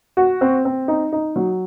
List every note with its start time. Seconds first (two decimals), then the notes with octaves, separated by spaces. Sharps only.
0.17 F#4
0.41 C4
0.65 C4
0.88 D#4
1.13 D#4
1.36 F#3